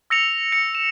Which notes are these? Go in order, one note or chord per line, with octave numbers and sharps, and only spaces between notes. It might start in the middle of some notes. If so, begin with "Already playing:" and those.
E6 A#6 C#7 F7
C#7
E7